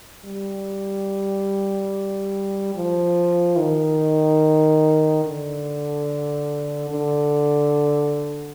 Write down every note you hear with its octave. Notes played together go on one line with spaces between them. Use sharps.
G3
F3
D#3
D3
D3